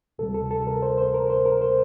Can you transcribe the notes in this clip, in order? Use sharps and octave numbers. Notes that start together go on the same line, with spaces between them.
D2 C3 G3 A4
A4
A4
A#4
C5
C5
A#4
C5
A#4
C5